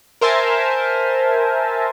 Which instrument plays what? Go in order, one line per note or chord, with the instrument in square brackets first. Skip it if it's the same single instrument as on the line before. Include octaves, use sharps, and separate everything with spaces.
[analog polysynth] A#4 C5 E5 G#5 A5